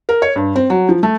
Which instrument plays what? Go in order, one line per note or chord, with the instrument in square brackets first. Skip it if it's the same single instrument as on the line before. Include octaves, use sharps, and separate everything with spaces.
[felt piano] A#4
C#5
G2
C4
F#3
F3
A3